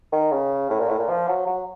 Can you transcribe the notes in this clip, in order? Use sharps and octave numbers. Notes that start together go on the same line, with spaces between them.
D#3
C#3
A2
A#2
A2
A#2
F3
F#3
F#3